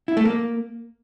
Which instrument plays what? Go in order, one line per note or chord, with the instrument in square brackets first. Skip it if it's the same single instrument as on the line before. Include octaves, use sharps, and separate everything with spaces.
[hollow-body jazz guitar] E4
A3
A#3